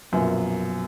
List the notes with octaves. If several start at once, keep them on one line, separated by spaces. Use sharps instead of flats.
A#1 F#2 B2 F4 A#4 E5